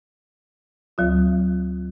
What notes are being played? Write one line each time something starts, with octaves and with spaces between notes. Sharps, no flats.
D2 F#3 F4